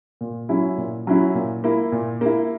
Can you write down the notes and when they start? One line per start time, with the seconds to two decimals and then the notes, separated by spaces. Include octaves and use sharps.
0.21 A#2
0.49 F#3 C#4 E4
0.78 A#2
1.07 F#3 C#4 E4
1.35 A#2
1.64 A#3 E4
1.92 A#2
2.21 A#3 E4